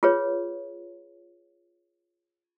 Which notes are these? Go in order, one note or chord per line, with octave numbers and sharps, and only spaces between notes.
F4 G#4 B4 C#5